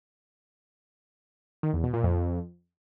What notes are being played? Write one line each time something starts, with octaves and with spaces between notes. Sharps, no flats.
D#3
E2
B2
A#2
F2